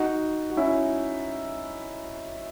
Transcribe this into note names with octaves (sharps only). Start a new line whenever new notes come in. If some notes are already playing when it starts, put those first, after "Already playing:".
Already playing: D#4 F#4
F#4
C#4 E4